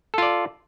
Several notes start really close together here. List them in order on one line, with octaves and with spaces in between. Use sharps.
A4 F4 D5